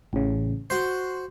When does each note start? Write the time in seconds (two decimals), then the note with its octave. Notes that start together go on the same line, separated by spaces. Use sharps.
0.13 A1 C#3
0.70 F#4 C5 C6